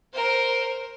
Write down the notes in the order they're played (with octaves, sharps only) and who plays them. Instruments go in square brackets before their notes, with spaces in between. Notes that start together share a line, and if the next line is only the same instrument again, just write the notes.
[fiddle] A#4 C5